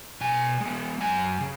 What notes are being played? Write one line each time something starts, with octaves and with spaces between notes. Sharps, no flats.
B2 G#5
G#3
B3
F#2 G#5
C#3